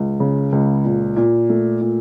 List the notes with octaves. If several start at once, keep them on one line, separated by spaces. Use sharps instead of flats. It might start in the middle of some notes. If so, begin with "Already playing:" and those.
Already playing: C#2
C#3
C#2
A#2
A#2
A3
A#2